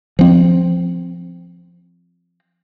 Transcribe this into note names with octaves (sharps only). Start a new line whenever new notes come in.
F3 C4